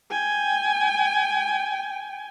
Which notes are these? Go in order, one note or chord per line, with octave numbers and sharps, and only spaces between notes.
G5 G#5